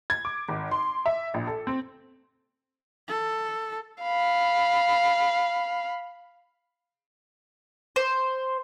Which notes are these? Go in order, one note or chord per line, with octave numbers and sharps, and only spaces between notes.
G#6
D6
G#1
C6
E5
A#1
A4
C4
A4
F5 B5
C5